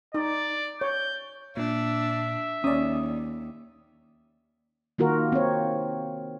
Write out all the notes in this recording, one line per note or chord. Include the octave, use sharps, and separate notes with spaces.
D#4 D5
C#5 G6
A#2 D4 E5
D#2 C#4 D5 D#6
D#3 A#3 F4 F#4 A#4
C4 C#5